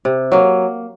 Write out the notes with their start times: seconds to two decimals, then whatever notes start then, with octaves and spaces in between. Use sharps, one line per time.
0.05 C3
0.32 F#3 A#3